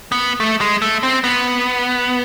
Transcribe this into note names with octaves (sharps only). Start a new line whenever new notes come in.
B3
A3
G#3
A3
C4
B3